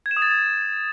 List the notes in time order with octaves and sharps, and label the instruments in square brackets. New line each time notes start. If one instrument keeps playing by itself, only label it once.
[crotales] G#6
E7
D#6
A6